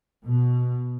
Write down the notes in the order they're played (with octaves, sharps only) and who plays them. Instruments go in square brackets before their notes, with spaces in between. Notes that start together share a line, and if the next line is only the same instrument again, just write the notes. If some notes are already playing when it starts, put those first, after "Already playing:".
[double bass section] B2